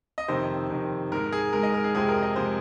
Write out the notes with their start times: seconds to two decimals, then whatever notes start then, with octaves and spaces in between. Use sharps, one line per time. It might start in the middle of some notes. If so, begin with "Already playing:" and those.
0.18 D#5
0.28 F2 C3 D#3 C5
0.70 F2 C3 D#3
1.12 G#2 G#3 A#4
1.33 G#4
1.53 G#2 G#3 A#4
1.63 D#5
1.74 A#4
1.84 G#4
1.95 F2 C3 F3 G#3 G#4
2.09 A#4
2.22 D#5
2.36 C3 F3 G#3 C5